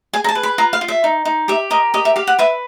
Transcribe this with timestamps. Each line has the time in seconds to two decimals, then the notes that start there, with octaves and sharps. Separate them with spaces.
0.13 G#4 G#5
0.24 A#5
0.29 A5
0.35 B4
0.43 B5
0.58 F4 A#5
0.73 F5
0.81 F4
0.88 E5
1.04 D#4
1.25 D#4
1.48 G4 E5
1.70 A#4 D#5
1.94 G4 D#5
2.05 E5
2.16 G4 F5
2.27 F#5
2.39 B4 E5